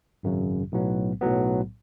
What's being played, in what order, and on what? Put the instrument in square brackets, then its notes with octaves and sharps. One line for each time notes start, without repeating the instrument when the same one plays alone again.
[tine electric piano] G#1 F#2 C#3 F#3
B1 A2 F#3 B3
B1 A2 F#3 B3